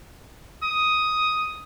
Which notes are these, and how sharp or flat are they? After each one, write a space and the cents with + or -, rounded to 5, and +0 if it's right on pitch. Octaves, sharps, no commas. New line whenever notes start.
D#6 +5